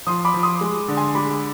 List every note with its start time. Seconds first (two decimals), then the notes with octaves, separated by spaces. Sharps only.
0.07 F3 C6 D#6
0.25 B5 D6
0.34 F3
0.43 C6 D#6
0.61 G#3
0.88 D3
0.97 G#5 C6
1.15 G#3 B5 D6